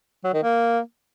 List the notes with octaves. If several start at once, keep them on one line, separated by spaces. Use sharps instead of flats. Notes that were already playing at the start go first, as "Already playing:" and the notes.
F#3
D#3
A#3